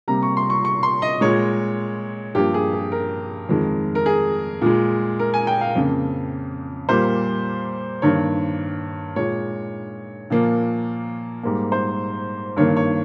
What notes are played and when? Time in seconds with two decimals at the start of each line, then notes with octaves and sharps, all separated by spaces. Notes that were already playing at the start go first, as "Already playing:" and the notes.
0.08 C3 G3 A#3 A#5
0.23 C#6
0.37 C6
0.50 C#6
0.65 C#6
0.83 C6
1.02 D#5
1.21 A#2 G#3 C#5
2.35 G2 F3 A#3 G4
2.54 G#4
2.73 G#4
2.92 A#4
3.49 F2 D#3 G#3
3.95 A#4
4.06 G#4
4.61 A#2 G#3
5.19 A#4
5.34 G#5
5.47 G5
5.61 F5
5.75 F2 C#3 F3 A#3
6.89 A#2 G3 A#3 C5
8.02 G2 D#3 A#3 C#5
9.16 A#2 G#3 C#5
10.30 A#2 F3 A#3
11.43 G#2 G3 A#3
11.72 C5
12.57 G2 D#3 A#3 C#5
12.77 C#5